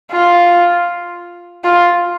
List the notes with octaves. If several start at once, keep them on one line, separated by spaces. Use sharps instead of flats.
F4
F4